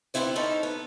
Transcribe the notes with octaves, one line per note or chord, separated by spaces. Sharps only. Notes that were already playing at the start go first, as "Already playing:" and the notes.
D2 G#2 B3 C4 E4 C5
C#4 D#4 E4 A4
B3